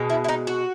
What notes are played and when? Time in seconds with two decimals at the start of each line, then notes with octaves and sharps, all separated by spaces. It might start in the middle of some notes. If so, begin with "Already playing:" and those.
Already playing: B2 G#3
0.10 E4
0.24 E4
0.29 D#4
0.47 F#4